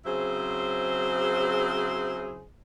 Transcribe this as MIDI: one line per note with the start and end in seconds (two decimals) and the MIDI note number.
0.06 2.43 49
0.06 2.43 54
0.06 2.43 60
0.06 2.43 64
0.06 2.43 68
0.06 2.43 72